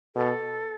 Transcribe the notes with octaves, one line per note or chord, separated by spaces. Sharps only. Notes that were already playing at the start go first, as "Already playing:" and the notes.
B2 A4